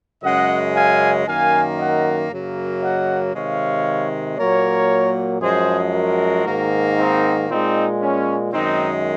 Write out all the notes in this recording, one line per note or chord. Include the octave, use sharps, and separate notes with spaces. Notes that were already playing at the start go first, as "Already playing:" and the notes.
F#2 C#3 G#3 D#5 F#5
F5 G#5
F#2 D#3 A#3 F5 G#5
D#5 F#5
F#2 C#3 F#3 A#3
D#5 F#5
C3 D#3 G#3 C#5 F5
A#2 F#3 A#3 A#4 C#5
F#2 F3 G#3 G#4 C5
F#4 A#4
G#2 D#3 A#3
C4 D#4
A#2 G#3 C4 D#4
C#4
F#2 D#3 G#3 C4 D#4